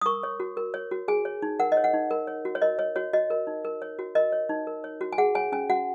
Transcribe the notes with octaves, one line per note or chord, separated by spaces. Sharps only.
D#6
A#4 C#6
C#5
F#4
A#4
C#5
F#4
G#4 G#5
C#5
D#4
A#4 F#5
D#5
C#5
F#5
D#4
A#4
C#5
F#4
C#5
A#4 D#5
C#5
F#4 C#5
F#4 D#5
A#4
D#4
A#4
C#5
F#4
A#4 D#5
C#5
D#4
A#4
C#5
F#4
G#5
G#4 F#5
C#5 G#5
C#4 G#5
F#4 F#5